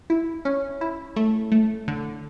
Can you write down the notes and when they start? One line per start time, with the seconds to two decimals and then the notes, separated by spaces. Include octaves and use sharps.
0.10 E4
0.45 C#4
0.81 E4
1.16 A3
1.52 A3
1.88 D3